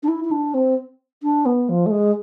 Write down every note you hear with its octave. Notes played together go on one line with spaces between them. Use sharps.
D4
E4
E4
D4
C4
D4
B3
F3
A3
G#3